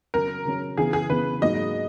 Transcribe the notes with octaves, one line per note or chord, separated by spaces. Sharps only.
C#3 F#3 C#4 A#4
C#3 F#3 C#4
C#3 E3 B3 G#4
G#4
C#3 E3 B3 B4
G#2 F#3 A#3 D#4 G#4 D#5